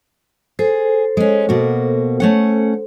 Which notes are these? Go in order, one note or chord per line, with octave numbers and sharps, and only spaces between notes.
G#4 A4 C5
G#3 C#4
B2 A#3 F#4
A3 C#4 F#5